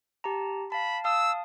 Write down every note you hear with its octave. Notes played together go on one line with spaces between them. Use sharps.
G4 A5 A#5
F5 A5 B5
F5 A5 D#6 E6